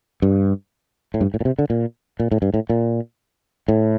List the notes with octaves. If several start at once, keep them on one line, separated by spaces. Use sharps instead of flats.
G2
A2
G2
A2
A#2
C3
D3
A#2
A#2
A2
G2
A2
A#2
A2